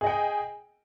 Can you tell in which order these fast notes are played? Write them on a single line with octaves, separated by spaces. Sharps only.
G#4 D#5 G5